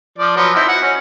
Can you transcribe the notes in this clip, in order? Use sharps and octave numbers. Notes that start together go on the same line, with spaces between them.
F3 D5
F3 F#3 B4
C4 D#4 E4
F#4 F#5
C#4